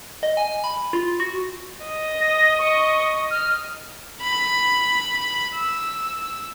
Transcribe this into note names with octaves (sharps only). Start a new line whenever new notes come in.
D#5
G#5
B5
F4
F#4
D#5
A#6
C#6
F6
B5
E6